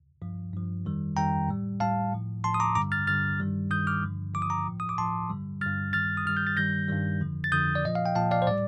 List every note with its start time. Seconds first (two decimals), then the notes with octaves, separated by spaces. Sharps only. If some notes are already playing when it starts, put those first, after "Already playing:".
0.22 G2 F3
0.53 G2 F3
0.85 F2 D#3 G3
1.17 F2 D#3 G3 G5 A#5
1.49 A2 G3
1.80 A2 G3 F5 A5
2.12 A2 F3
2.44 A2 F3 A5 C6
2.54 D#6
2.60 A#5 D6
2.75 G2 D3 G3 A#5 D6
2.92 F6 A6
3.07 G2 D3 G3 F6 A6
3.39 G2 D#3 G3
3.71 G2 D#3 G3 D#6 G6
3.87 D6 F6
4.03 G2 D3 F3
4.34 G2 D3 F3 D6
4.42 D#6
4.50 A#5 D6
4.66 A2 F3
4.80 D#6
4.89 D6
4.98 A2 F3 A5 C6
5.30 G2 D3 G3
5.61 G2 D3 G3 F6 A6
5.93 G2 D#3 G3 F6 A6
6.17 D#6
6.25 G2 D#3 G3 F6
6.37 G6
6.47 A6
6.57 G2 D#3 G3 G6 A#6
6.88 G2 D#3 G3
7.21 F2 D3 F3
7.44 A6
7.52 F2 D3 F3 D#6 G6
7.75 D5
7.84 A#2 F3 D#5
7.95 F5
8.06 G5
8.15 A#2 F3 F5 A5
8.31 D5 F5
8.42 C5
8.47 A2 G3 D5